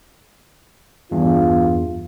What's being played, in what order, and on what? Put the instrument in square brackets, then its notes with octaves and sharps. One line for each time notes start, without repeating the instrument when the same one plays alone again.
[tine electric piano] E2 G2 [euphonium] F4